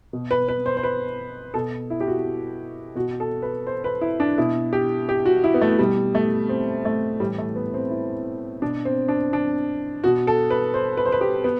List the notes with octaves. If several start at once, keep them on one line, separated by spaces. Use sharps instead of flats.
B2
B4
B4
C5
C5
B4
B2 A4
E4
G4
F#4
B2 F#4
A4
B4
C5
B4
E4
D4
B2 E4
G4
G4
F#4
E4
B3
A3
B2 G3
A3
C4
A3
A2 E3 G3
A3
B3
C4
E4
B2 D4
C4
D4
D4
B2 F#4
A4
B4
C5
B4
C5
B4
G4
B3